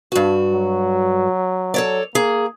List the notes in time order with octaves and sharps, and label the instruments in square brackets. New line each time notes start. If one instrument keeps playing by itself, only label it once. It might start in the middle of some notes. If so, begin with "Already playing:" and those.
[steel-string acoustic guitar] G2 F#4
[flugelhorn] F#3
[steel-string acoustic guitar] A4 C#5 D5
[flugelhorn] A#3 [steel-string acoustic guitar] G#4